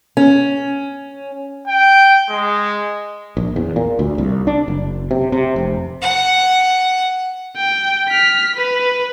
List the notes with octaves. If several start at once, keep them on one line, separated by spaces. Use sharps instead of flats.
C#4
G5
G#3
A#1
E2
A#2
D2
C2
D4
F#1
C3
C3
F1
F#5
G5
F6 B6
B4